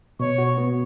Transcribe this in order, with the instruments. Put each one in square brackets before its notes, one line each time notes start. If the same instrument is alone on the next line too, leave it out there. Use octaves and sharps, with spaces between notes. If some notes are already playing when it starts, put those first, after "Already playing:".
[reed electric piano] B2 [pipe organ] C#5
[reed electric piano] F#4
B3